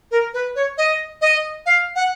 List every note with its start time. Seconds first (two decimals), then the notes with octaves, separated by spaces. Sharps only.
0.11 A#4
0.34 B4
0.56 C#5
0.78 D#5
1.22 D#5
1.66 F5
1.96 F#5